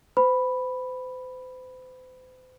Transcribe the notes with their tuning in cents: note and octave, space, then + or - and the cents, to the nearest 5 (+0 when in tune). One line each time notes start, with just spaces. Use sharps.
C5 -40 B5 +0